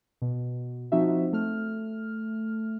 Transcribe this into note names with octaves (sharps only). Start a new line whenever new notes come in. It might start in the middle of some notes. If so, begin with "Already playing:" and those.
B2
F3 C4 D#4 F#4 E5
A3 F6